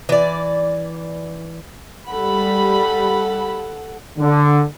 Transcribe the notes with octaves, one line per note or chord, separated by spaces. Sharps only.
E3 D5
G3 A4 F#5 B5
D3